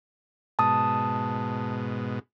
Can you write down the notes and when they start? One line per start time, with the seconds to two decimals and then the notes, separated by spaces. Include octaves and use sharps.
0.59 G#2 B2 A5 D#6